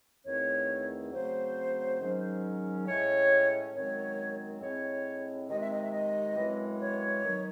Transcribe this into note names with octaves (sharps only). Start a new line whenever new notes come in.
E2 D#3 A3 C4 C#5
C#3 F#3 A3 C4 C5
G#2 D#3 F#3 C#4
A2 G#3 C#4 C#5
F#2 D#3 G#3 C4 C#5
A2 G#3 C4 C#5
C3 D#3 G#3 C4 D#5
E5
D#5
E5
D#5
F#2 E3 G#3 C4
C#5
D#3 F#3